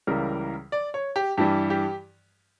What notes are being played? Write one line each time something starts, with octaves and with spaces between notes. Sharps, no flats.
C#2 C#3 E3 G3 A#4
D5
C#5
G4
G2 E3 G3 G4
G4